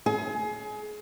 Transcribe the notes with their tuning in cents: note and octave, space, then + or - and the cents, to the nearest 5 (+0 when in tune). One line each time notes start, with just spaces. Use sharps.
G#4 +30